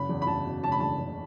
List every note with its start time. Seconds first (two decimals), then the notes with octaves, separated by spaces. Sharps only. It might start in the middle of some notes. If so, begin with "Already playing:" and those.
Already playing: F#1 B5
0.09 E2
0.22 B5
0.27 F#1 A5
0.45 B2
0.63 F#1 A5
0.72 B5
0.80 E2 A5
1.00 F#1